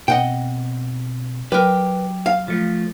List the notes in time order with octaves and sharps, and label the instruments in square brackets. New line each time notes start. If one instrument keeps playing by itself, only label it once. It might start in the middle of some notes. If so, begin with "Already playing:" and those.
[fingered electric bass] B2 B3 C4 [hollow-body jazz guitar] D#5 F#5 G5
[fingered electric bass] F#3 [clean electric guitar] G4 [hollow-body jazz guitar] A#4 B4
[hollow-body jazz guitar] F5
[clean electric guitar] F3 A3